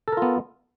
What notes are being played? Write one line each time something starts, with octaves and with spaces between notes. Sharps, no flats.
B3 F4 A4 A#4